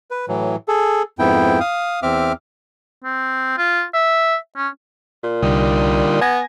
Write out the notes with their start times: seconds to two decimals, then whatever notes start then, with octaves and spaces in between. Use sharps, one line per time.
0.11 B4
0.28 A2 E3 F#3
0.68 G#4 A4
1.19 F2 G#2 B3 E4 G5
1.60 F5 D#6
2.03 E2 C4 E5 D6 F6
3.04 C4
3.58 F4
3.94 E5
4.57 C#4
5.24 A#2
5.43 C2 D3 G3 D#4
6.21 B3 G#5 G#6 A#6